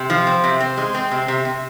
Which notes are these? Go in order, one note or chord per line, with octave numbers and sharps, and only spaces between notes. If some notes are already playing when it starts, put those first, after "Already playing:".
Already playing: C3
F3
C4
C3
C4
G#3
C4
C3
C3
C3